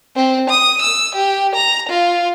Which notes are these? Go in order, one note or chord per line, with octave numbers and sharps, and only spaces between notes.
C4
D#6
E6
G4
A#5
F4